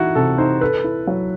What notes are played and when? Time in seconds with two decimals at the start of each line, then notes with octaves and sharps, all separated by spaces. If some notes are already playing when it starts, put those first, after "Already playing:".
Already playing: E3 D#4 E4 F#4
0.15 C3 A4
0.38 D#4 C5
0.61 A4 B4
0.84 E4
1.07 F#3